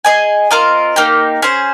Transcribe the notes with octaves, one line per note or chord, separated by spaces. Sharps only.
G#4 D#5 G#5
C4 F4 A#4 D#5
A#3 D#4 G4
C#4 G#4 C5